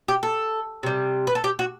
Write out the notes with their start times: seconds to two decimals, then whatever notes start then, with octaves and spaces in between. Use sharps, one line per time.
0.08 G4
0.23 A4
0.83 C3 G3
1.27 B4
1.35 A4
1.44 G4
1.59 F#4